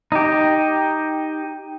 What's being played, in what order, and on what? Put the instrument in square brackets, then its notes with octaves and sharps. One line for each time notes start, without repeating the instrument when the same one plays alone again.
[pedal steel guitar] D#4 G4